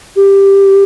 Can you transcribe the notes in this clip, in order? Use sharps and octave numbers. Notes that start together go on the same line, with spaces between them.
G4